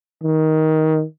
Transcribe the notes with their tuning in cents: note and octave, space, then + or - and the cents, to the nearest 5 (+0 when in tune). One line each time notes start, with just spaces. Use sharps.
D#3 +15